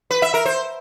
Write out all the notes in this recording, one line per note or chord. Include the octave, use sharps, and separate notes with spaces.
B4
E5
A#4
C5